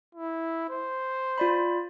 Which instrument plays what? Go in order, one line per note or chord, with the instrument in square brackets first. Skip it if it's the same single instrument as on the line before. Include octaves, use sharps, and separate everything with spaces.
[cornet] E4
C5
[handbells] F4 D5 B5